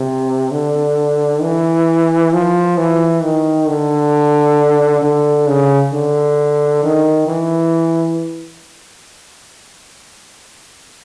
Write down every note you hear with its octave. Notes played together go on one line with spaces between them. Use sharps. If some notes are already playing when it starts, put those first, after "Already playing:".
Already playing: C3
D3
E3
F3
E3
D#3
D3
D3
C#3
D3
D#3
E3